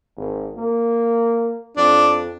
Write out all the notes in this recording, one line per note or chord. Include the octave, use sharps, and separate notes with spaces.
G#1
A#3
F2 D4